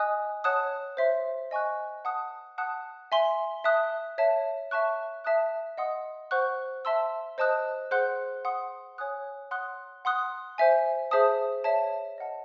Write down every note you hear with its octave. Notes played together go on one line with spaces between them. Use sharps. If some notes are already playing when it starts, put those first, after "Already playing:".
Already playing: D#5 G#5 D#6 F#6
C#5 F#5 A5 D#6 F#6
C5 E5 C6
D#5 G#5 C#6 F#6
F#5 A5 D#6 F#6
F#5 A5 D#6 F#6
E5 G#5 C6
E5 A5 D#6 F#6
C#5 E5 A5
E5 A5 C#6 F#6
E5 A5 D#6 F#6
D#5 F#5 C6 D#6
C5 F#5 C#6 F#6
E5 A5 C6 E6
C5 D#5 A5 D#6 F#6
G#4 C5 F#5 C6 F#6
F#5 C6 D#6
C#5 G#5 D#6 F#6
F#5 C6 D#6 F#6
F#5 C6 D#6 F#6
C5 E5 G#5
G#4 C5 E5 A5 D#6
C#5 E5 A5
D#5 F#5 A5